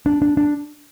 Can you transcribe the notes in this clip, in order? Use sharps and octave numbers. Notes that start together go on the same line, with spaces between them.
D4
D4
D4